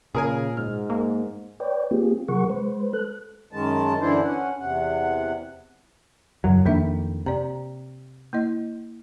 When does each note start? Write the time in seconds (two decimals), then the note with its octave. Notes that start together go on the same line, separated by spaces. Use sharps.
0.15 A#2 C#3 G#4 A#4 G#5
0.57 G#2 F6
0.90 A#3
1.60 B4 C#5 D5 G5
1.91 A#3 C4 F4 G4 G#4
2.28 C3 F#3 G#4 A#4 F#5 C#6
2.50 G#3 B4 C5
2.93 A4 F#6
3.53 F#2 D#3 G#3 A5
4.01 F#2 D3 E3 D4 E4 C5
4.24 C#4 F#5
4.60 E2 C3 F#5
6.44 F#1 F#2 F#3
6.65 F2 D#3 A#3 D4 E5
7.26 C3 D5 A#5
8.33 A#3 E4 D#5